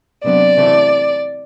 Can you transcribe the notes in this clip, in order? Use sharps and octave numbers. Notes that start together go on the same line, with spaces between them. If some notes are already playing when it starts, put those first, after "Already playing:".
C3 F#3 B3 D4 D5
C3 E3 A3